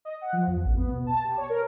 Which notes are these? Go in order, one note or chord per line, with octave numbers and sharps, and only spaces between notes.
D#5
F#5
F3
E2
A1
B3
B2
A5
G4
C#5
A#4